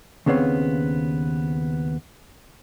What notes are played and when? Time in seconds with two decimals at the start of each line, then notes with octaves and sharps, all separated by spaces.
0.26 D#2 C#3 B3 C4 C#5 F5